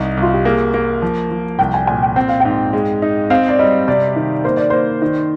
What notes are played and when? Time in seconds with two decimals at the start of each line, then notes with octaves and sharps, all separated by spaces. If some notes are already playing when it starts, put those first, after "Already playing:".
Already playing: C2 D#4
0.17 C2
0.23 F4
0.33 G4
0.45 A#3 G#4
0.74 A#3
1.02 F3
1.31 F3
1.59 C2 G5
1.74 G#5
1.87 A#2 G#5
2.02 G5
2.16 C4 G5
2.29 F5
2.40 G#2 G5
2.73 G#3
3.02 D#4
3.30 C4 F5
3.49 D5
3.59 G3 D#5
3.88 C3 D5
4.16 D#3
4.44 A#3 C5
4.57 D5
4.70 A#3 C5
5.02 D#3